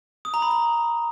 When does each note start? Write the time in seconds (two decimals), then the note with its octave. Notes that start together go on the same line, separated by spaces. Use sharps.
0.25 D#6
0.34 A#5
0.42 B5
0.51 A#5